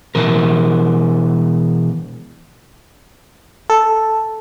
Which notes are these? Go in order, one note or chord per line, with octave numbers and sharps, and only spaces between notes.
B2 E3 A#4
A4